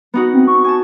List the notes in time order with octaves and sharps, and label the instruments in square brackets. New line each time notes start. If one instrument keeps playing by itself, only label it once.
[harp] B3 D#4 F#4
[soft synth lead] C4
C#6
[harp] G#5 A5 [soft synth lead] C#6